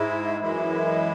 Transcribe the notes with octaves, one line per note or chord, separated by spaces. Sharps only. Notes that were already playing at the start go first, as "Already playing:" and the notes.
Already playing: G#2 G#3 E4
F#2 E3 G#3 E4